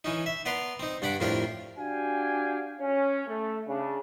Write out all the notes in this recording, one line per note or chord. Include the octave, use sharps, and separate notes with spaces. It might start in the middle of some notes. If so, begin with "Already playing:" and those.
E3 C#4 D#4
E5
B3 B4 D5 A#5 C6
C4 D#4
G2 D4 F#5 B5 D6
F2 A2 D4 F4 G4 A#4
D4 F#4 G4 F5 G5 G#5
C#4
A3
C#3 D4